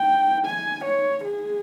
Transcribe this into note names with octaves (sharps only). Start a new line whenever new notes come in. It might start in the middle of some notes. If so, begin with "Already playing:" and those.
Already playing: G5
G#5
C#5
G#4